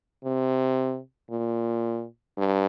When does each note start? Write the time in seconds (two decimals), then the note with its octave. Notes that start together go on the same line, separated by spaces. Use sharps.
0.24 C3
1.30 A#2
2.38 G2